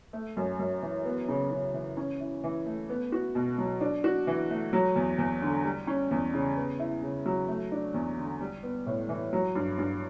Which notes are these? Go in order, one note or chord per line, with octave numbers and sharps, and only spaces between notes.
A3
F#2
F#2
E3
B3
C#3
C#3
E3
C#4
E4
E3
A3
B3
F#4
B2
F#3
D4
F#4
E3
A3
F#3
E2
E2
D3
G3
C#4
E2
C#3
B3
E4
C#3
F#3
A3
D4
E2
D3
G3
B3
A2
E3
F#3
G2
G2